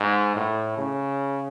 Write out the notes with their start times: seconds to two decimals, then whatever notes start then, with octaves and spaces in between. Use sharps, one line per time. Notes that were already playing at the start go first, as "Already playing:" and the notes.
Already playing: G#2
0.36 A2
0.77 C#3